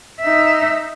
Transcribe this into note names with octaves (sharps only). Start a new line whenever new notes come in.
D#4 E5